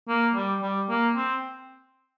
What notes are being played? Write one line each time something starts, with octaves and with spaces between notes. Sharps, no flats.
A#3
G3
G3
A#3
C4